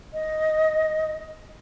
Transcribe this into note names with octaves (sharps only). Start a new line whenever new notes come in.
D#5